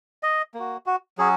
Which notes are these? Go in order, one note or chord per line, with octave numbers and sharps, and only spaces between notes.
D#5
A#3 F#4
F#4
F#3 C#4 F#4 G#4